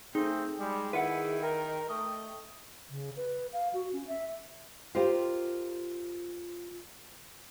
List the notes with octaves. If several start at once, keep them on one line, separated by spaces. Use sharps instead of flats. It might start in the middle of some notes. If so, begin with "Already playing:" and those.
A3 C4 D#4 G#4
G3 G#3
D#3 E4 B4 F#5
A#4 G5
A3 D#5
C#3
B4
F5
F#4
C#4
E5
F4 G4 A#4 C5 D#5 F5